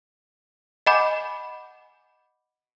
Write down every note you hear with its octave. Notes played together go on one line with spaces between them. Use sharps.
D#5 F#5 G#5 B5 D6 G6